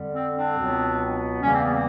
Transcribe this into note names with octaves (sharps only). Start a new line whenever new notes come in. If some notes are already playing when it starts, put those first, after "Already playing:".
Already playing: F2 D3 G3
C4
C4 D4
C#2 B2 F#3 B3
E2 C#3 E3 G3 A#3 C#4
C4
B3
C4